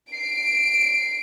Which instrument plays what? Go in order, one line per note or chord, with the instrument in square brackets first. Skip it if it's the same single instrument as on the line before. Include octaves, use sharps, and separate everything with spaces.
[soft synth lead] C7 [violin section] D7